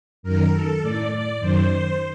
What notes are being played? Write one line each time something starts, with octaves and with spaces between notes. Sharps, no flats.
F#2 D#3 A#4
A4
A2 D5
D5
F#2 D#3 C5
C5